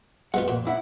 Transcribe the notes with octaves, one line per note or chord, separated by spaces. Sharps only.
G#3 B3 F4 F#5
F2 A#2
C#2 E4 F#5